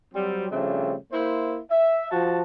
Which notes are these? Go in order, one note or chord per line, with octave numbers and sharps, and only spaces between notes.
F#3 G3 C4
C#3 F3 G3 A3 C4 D4
A#3 E4 C5
E5
F3 F#4 A5